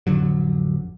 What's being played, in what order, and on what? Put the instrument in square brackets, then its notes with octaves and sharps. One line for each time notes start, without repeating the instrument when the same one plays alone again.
[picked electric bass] A1 F2 D3 F#3